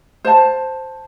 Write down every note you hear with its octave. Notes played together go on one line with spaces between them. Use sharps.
C5 A5